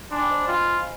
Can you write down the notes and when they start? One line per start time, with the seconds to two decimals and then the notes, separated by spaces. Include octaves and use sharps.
0.11 D4 G#5 C6
0.21 G5 B5
0.30 C5 D#5
0.48 F4 D#5 G5